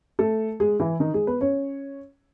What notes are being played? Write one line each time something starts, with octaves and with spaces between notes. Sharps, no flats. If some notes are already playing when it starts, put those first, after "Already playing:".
A3 A4
G#3 G#4
E3 E4
D#3 D#4
G#3 G#4
B3 B4
C#4 C#5